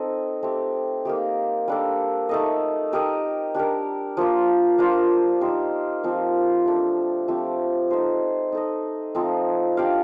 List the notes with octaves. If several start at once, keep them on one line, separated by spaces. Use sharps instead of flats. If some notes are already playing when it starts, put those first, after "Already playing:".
Already playing: C4 D#4 A4 D#5
A3 C4 G4
A#3 D#4 G4
G3 A#3 D4 A4
A3 D#4 A4 D#5
D#4 G4 A#4 D#5
D4 G4 A#4
F3 A#3 F4
A#3 D4 F4 C5
D#4 G4 C5
F3 C4 G4
A3 D4 A4
F3 A3 C4 G4
D#4 A4 C5
D#4 A4 D#5
F3 A3 C4 D#4
D4 G4 D5 F5